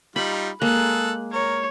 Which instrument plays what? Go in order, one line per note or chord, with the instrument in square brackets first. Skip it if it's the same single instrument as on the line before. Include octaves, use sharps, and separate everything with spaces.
[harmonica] G3 D#4 F4 [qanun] B5
[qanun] G#3 A#3 [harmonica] G#4 A4 [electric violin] F#6
[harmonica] A#4 [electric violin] C#5